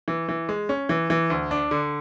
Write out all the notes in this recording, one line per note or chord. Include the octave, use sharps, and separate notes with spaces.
E3
E3
G#3
C#4
E3
E3
D2
D4
D3